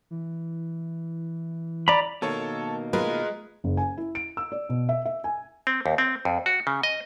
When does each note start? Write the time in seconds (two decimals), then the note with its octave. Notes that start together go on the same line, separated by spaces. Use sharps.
0.11 E3
1.88 D5 A#5 B5
2.22 B2 D#3 A#3 A4 C#5 A5
2.93 G#3 F4 A#4 B4
3.64 F#1
3.77 G#5
3.97 E4
4.15 D7
4.37 E6
4.52 D5
4.69 B2
4.89 E5
5.05 E5
5.24 G#5
5.67 C4
5.86 D#2
5.98 C4
6.25 F2
6.46 F#4
6.67 C#3
6.83 D#5